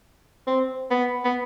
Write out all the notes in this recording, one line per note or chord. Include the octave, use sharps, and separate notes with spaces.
C4
B3
B3